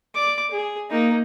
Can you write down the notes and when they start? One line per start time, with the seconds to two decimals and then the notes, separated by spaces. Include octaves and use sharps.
0.15 D5 D6
0.51 G#4
0.90 A#3 D#4